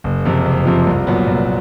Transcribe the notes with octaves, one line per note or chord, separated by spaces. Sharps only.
F#1
F2 C3 F3
F#1
F2 C3 F3
C2
A#2 F#3 B3
C2